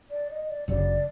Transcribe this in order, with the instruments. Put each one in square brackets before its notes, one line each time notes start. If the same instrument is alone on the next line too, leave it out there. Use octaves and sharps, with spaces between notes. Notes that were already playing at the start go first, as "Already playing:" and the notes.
[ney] D5
D#5
D5
[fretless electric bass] G1 F#2 C#3 [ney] D5